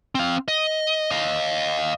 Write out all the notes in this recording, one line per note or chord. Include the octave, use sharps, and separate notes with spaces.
C4 F5
D#5
D#5 F5